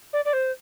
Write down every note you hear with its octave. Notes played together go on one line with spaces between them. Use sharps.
D5
D5
C5